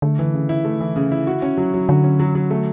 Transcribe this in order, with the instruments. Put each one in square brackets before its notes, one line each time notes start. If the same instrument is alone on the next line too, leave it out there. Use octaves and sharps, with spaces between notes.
[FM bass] D3 [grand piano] A3
[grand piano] E3
C#3
E4
A3
E3
C#3
E4
F#4
C#4
F#3
F#3
[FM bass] D3 [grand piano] F#4
[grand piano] C#4
F#3
F#3
A3